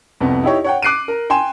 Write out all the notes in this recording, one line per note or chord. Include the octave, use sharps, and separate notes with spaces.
C2 F2 B3
D#4 E4 G4 C#5
C#5 F#5 G5
D6 F#6 C7 D7 D#7
A#4
G5 G#5 C6 E7